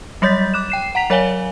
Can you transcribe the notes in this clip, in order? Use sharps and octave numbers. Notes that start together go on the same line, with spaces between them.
F#3 G3 C#5 G6 A6 B6
D6 F#6 E7
G5 C7 E7
F#5 A#5 B6 F7
F#3 A#4 C#5 F5 G#5 G7